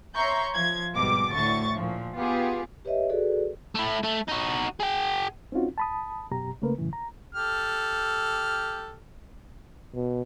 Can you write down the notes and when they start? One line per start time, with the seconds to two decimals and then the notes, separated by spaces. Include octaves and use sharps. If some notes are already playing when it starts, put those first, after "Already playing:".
0.14 C#5 E5 A#5 C6 C#6 G6
0.55 F3 G#6
0.93 G#1 B2 G3 D6
1.32 D2 A2 D3 C#6 A6
1.75 A#2 F3
2.17 B3 F4 G4 G#4
2.85 G4 B4 C#5 D#5 E5
3.09 F#4 G#4 A4 B4 D5
3.75 A3 E4
4.03 A3
4.28 D#4 F#4
4.80 G#4 G5
5.52 C4 C#4 D#4 F4 F#4
5.78 A5 B5 D#6
6.31 F#2 B2 G4 A#5
6.62 C#3 A3 A#3 A#4 B4
6.78 F#2 A2 C#3 E3
6.93 A#5
7.35 G4 A4 F6
9.95 B2